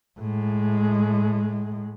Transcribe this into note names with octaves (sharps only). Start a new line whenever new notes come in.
A2 G#3